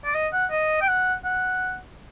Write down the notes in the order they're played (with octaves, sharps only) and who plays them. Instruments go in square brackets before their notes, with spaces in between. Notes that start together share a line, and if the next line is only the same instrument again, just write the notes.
[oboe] D5
D#5
F#5
D#5
G5
F#5
F#5